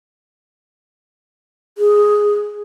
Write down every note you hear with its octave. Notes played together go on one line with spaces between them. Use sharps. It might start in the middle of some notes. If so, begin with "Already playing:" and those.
G#4